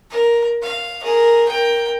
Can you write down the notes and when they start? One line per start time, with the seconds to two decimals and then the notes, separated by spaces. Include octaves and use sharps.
0.11 A#4
0.62 F5
1.03 G#4 A#4
1.48 A#4 G5